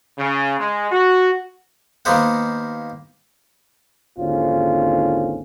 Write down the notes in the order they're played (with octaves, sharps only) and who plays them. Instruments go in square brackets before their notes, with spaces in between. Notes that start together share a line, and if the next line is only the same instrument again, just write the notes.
[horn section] C#3
G#3
F#4
[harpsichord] D#2 A#3 B3 C5 F#5
[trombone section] G#1 D#2 D3 C4 C#4 F4